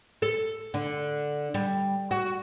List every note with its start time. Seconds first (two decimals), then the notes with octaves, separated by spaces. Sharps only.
0.22 A4
0.74 D3
1.54 G3
2.11 F#4